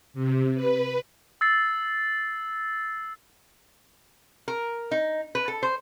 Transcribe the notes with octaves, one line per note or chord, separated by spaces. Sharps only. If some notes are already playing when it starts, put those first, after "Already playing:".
C3
B4
E6 A6 C7
A#4
D#4
B4
A4
C5